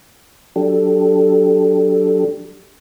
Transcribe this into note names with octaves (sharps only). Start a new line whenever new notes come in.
F#3 D4 G4 A4